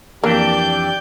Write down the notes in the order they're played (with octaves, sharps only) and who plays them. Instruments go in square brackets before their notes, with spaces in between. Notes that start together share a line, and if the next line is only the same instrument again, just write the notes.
[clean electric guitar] F2 E3 D4 [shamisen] A#3 [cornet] G4 [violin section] D5 G6